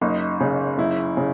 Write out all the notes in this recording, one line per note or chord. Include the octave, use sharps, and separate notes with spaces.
F#1 D#4
C#3
F#1 E4
C#3